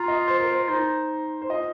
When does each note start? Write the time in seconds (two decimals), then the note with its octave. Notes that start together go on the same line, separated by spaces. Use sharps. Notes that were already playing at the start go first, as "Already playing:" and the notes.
Already playing: F4 A#5
0.08 D#5
0.28 C5
0.40 A#4
0.52 C5
0.69 D#4 C5
1.42 C5
1.49 F4 D#5